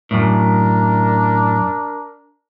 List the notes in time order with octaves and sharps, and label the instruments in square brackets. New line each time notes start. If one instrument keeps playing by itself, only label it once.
[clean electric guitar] F#2 A2 [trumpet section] D4 A#4